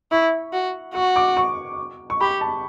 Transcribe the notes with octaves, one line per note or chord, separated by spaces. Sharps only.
E4 C#6
F#4
F#4 C#6
D6
C#6
C#6
G4 B5
A5